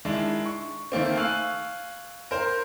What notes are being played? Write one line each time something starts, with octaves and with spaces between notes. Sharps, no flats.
D#3 G#3 D4 E4
C#6
D#3 A3 A#3 C4
F5 G#5 C#6 E6 F#6
A#4 C5